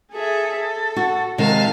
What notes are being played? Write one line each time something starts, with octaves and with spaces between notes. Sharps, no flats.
G#4 A4 E5
A4
F#4
C3 D#3 G#3 F5 A5